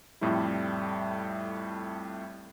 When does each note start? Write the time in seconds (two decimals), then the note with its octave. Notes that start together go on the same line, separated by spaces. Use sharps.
0.21 F2 A2 G3 A3 E4